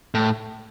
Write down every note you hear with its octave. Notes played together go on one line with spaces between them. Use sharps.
A2